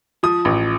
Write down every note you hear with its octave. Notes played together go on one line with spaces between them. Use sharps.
F3 D#6
A1